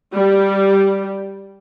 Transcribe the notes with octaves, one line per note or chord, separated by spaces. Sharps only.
G3